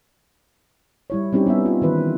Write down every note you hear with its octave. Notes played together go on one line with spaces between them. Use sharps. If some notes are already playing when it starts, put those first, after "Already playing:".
G3 E4 C#5
G3 C4 C#4 D#4 G4
G3 B3 E5
F4
D#3 E3 B4